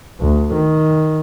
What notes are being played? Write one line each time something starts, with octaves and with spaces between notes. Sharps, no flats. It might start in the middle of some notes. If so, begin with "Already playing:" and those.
D2
D#3